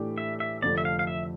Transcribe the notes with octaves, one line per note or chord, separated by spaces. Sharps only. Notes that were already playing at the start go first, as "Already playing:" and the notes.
Already playing: A2 E3 A3 D4 G4
E5
E5
F1 F2 D3 F3 A3 D5
E5
F5
F5
E5